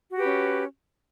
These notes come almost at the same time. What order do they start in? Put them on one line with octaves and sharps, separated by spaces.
F#4 G4 B4 C#4